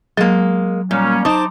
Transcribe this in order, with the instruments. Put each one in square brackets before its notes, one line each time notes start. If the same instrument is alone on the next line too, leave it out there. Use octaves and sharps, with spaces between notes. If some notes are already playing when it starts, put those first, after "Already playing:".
[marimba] F#3 [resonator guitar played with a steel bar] G#3 A#3
[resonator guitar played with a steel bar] A#2 [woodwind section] G3 A#3 C#4
[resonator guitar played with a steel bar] D#4 C5 [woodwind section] A5 D6 [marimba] D#6